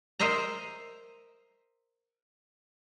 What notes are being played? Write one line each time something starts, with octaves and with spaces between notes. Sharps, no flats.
A#4 C5 D#5 E5 A#5